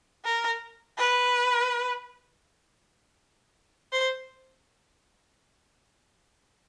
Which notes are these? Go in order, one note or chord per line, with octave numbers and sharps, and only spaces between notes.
A#4
B4
C5